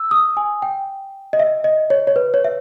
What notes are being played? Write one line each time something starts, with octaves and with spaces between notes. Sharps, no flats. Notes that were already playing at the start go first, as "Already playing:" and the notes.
Already playing: E6
D#6
G#5
G5
D#5
E5
D#5
C#5
C#5
B4
C#5
E5